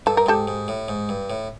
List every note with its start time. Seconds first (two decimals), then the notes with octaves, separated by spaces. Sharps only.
0.06 G2 A4
0.17 A#4
0.26 G#2 G4 A4
0.47 G#2
0.68 A2
0.88 G#2
1.09 G2
1.30 A2